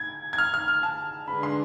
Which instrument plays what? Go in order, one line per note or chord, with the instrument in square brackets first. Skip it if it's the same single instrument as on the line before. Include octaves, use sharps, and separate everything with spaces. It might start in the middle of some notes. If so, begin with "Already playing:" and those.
Already playing: [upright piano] G#6
G#6
F6
F6
F6
A5
[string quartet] D3 G#3 D4 G#4 B4 [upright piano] B5
[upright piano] C6